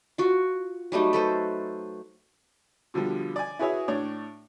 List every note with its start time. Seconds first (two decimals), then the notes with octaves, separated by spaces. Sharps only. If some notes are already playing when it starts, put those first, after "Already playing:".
0.18 F4 F#4
0.92 F#3 G3 A3 D#4
1.13 A4 B4 C5
2.94 B2 D3 F3 G3
3.36 D5 G#5
3.59 E4 F#4 G#4 B4 C#5 E5
3.88 A2 D4 C#5 D5